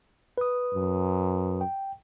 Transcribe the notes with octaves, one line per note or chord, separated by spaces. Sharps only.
B4 D#6
F#2
G5